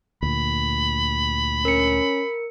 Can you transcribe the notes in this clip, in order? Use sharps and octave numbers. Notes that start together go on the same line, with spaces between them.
D2 A#2 B5
C#4 A#4 C#7